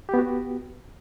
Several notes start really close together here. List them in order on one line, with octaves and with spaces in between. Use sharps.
G4 B3 F#4